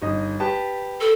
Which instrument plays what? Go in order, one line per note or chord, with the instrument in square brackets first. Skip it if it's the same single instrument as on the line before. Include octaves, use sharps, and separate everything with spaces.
[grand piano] G1 D#4 D#5
G4 B4 A5
[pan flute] A4